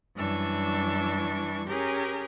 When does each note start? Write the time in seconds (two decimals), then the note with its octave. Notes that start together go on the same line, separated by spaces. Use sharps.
0.17 F#2 E3 G3 D4 C#6 E6
1.68 C#4 G4 G#4 A#4